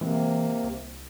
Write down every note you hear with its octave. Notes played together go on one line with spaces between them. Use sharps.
C3 E3 G#3 A#3 C4
C2